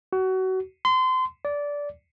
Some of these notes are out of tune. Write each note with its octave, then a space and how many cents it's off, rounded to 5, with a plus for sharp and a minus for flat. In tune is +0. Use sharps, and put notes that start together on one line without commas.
F#4 +25
C6 -30
D5 -15